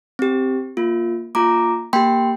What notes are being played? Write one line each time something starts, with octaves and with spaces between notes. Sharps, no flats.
C4 G4
A#3 F4
A#3 F4 A#5 D6
A#3 G4 G5 C6